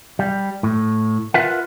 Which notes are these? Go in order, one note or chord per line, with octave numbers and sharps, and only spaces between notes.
G3
A2
F4 A#4 B4 E5 F#5